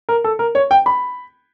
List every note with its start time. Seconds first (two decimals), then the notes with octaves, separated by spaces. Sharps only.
0.09 A#4
0.24 A4
0.39 A#4
0.55 C#5
0.71 G5
0.86 B5